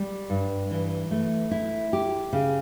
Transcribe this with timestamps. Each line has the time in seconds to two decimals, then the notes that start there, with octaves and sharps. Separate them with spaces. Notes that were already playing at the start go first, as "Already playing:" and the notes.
Already playing: G3
0.30 G2
0.71 E3
1.11 A3
1.51 E4
1.93 G4
2.33 C#3